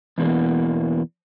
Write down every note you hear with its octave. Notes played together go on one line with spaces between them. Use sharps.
E2 B2 E3 A#3